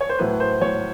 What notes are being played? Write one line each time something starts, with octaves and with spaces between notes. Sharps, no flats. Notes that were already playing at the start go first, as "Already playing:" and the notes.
C#5
C5
A2 F#3 B4
C5
A2 F#3 C#5